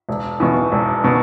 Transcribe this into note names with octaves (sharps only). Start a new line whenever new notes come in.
E1
E2 B2
E1
B2